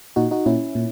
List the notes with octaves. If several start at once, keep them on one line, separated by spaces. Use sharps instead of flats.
A#2 D#4 F#4
D#4 F#4
A#2 C#4 E4
A#2